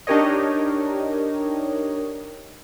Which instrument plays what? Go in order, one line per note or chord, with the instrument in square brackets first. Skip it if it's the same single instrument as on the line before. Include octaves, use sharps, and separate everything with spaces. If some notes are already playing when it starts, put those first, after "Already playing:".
[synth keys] D4 D#4 G4 A#4 C#5 D#5